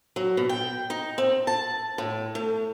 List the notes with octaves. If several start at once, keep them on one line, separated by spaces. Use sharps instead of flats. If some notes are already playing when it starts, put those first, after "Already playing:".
F#3
B2
G5
D#4
C4
A5
A2
A3